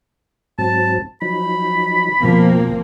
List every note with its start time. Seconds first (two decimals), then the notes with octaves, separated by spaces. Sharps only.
0.58 G#2 F#3 C4 A5
1.22 F3 F#3 D#4 B5
2.20 B2 F3 A#3 C4